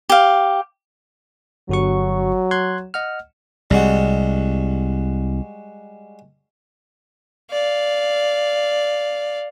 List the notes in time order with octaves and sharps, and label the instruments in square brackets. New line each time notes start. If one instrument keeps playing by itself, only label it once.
[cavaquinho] G4 F5
[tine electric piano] G1 F#4 C#6 [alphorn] F#3
[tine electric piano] C6 F#6 G#6
D#5 F#5 F6
[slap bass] C2 [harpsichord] G3 G#3 F#4
[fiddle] D5 F5